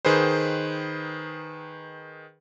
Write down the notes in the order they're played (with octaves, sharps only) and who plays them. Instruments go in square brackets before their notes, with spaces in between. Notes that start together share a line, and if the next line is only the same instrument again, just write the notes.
[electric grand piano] D#3 G#4 B4 C5